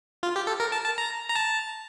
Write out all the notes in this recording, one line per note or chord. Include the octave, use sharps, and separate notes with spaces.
F4
G4
A4
A#4
A5
A5
A#5
A#5
A5